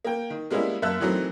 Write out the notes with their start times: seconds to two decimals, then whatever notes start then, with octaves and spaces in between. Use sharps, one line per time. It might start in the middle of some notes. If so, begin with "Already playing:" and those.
0.04 A#3 G5
0.30 D#3
0.50 G3 G#3 A#3 B3 C#4 E4
0.82 F#2 A#3 E5 A5 E6 F#6
1.00 D#3 E3 F#3 A3 C4